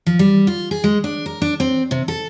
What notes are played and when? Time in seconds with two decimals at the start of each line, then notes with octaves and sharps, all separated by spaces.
0.06 F3
0.19 G3
0.47 F4
0.71 G#4
0.84 G#3
1.04 D4
1.26 A#4
1.42 D4
1.60 C4
1.91 C3
2.08 A4